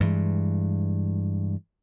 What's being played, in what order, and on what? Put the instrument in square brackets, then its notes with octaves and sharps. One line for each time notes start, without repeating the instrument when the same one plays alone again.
[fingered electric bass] G2 E3 G#3